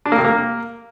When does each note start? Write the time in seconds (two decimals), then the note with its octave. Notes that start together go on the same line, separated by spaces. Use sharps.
0.06 D4
0.12 A#3
0.18 C3
0.25 A#3